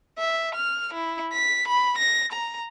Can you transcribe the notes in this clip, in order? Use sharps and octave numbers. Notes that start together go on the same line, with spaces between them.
E5
F6
E4
B6
B5
A#6
A#5